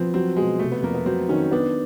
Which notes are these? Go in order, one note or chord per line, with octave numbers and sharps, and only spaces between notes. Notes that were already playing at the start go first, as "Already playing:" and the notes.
Already playing: F3 B3 C4
F#3 C4
B2 G#3
C3 A3
B3
F2 A#3
B3
F#3 C4
D#3 C#4
B3 D4